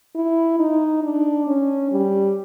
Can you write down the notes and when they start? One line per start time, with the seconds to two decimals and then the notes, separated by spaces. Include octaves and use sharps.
0.15 E4
0.59 D#4
1.03 D4
1.47 C#4
1.91 G3